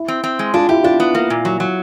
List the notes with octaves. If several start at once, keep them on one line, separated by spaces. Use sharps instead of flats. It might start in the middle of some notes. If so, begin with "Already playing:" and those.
Already playing: E4
C4
C4
G#3
D4 F4
E4 G4
D4 F4
B3
A#3
A#2
F#3
F#3